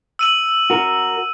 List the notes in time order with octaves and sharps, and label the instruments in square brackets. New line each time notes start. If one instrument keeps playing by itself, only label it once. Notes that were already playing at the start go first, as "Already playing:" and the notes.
[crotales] E6 D#7 F#7
[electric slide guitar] F#4 A#4